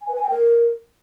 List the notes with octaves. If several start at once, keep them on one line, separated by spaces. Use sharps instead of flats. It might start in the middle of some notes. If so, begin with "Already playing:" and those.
G#5
B4
G#5
G5
A#4